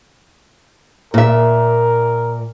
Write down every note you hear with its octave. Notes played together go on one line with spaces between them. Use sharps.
A#2 A#4 E5